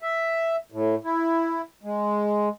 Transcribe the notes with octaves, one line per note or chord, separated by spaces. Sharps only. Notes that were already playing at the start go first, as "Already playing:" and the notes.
E5
A2
E4
G#3